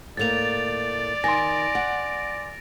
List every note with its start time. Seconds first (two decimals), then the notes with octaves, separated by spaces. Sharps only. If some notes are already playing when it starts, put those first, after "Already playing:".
0.17 A2 A3 A#3 D5 A6 F7
1.24 D#3 G#5 C6 A#6 D7
1.75 F#5